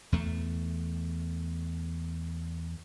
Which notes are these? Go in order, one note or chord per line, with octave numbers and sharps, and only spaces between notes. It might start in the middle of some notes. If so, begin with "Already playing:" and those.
E2 A3